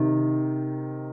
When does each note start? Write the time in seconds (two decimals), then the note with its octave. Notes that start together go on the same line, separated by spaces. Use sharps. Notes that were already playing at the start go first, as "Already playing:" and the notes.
Already playing: C3 D#3